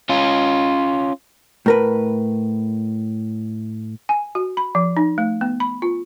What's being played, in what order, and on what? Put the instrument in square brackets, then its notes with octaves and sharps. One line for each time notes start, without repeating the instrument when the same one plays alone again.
[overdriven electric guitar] C#4 F4
[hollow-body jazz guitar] A2 A#4 B4
[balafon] G#5
F#4
B5
F3
D#4
A3
B3
B5
F4